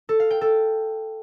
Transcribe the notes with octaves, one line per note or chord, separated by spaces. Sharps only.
A4
F5
G5
A4